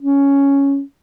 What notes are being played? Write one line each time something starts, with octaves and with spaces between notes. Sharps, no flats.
C#4